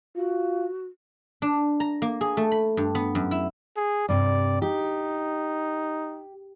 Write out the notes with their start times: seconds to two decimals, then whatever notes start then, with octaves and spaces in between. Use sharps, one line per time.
0.16 F4 F#4
1.42 D4
1.80 A#5
2.02 A#3
2.21 G#4
2.37 A3
2.52 B5
2.77 G2
2.95 B3
3.15 F#2
3.31 E4
3.77 G#4
4.09 G2 C3 D5
4.62 D#4 G4